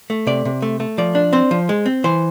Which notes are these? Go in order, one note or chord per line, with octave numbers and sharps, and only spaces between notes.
A3
C3 D5
C3
A3
A3
F3 D5
D4
C4 C5
F3
G#3
C4
E3 C5